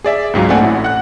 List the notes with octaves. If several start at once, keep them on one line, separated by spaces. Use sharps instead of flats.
G#4 D5 E5
C#2 G#2 F#3 F5
A3 A#3 C4 D5 F#5 G#5
A1 E4
F#5 F#6